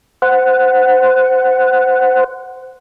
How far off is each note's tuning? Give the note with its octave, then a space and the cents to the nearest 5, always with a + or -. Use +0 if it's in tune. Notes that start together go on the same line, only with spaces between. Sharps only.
C5 -15 F#5 +0